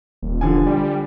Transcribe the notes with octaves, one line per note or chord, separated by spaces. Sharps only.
D#1
D3 F3 G#5
G3